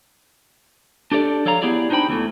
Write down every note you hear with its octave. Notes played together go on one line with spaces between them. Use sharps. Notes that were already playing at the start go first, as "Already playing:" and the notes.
D4 G4 A4 C#5 D5
F3 A4 C#5 F5 A#5
B3 E4 G4 G#4 D5
D4 D#4 F#4 C5 G5 B5
E2 E3 A3